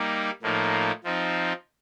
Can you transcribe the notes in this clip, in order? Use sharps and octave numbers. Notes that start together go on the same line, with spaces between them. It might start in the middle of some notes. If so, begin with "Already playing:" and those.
Already playing: G3 A#3 D#4
A2 F3 A#3 D#4
F3 C4 D#4